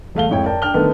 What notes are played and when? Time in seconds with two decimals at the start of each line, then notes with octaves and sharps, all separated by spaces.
0.15 E1 A3 F5 G7
0.29 F2 G#2 E4 C#5 G5
0.46 A#4 D5 G5 A5
0.62 D4 G5 F6 G7
0.74 D3 D#3 A3 B3